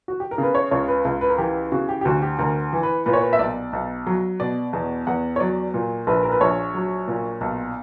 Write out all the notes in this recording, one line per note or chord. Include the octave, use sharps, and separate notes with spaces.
F#4
G4
A#4
C#3 B4
C#5
C#2 C#5
B4
C#2
B4
A#4
E3 G4
C#3 F#4
G4
G4
D2 F#4
G4
D2 A#4
E3
B4
A#2 B4
C#5
B4
E5
B1 D5
B1
F#3
B2 D5
E2
E2 F#5
C#5
F#3 D5
A#2
A#1 B4
A#4
B4
A#1 C#5
F#3
A#2
B1